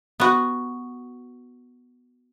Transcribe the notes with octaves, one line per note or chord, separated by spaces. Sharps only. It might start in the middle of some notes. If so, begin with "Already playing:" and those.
B3 F#4